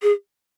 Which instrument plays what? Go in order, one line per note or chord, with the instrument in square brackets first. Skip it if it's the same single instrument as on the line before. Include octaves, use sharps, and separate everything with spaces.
[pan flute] G#4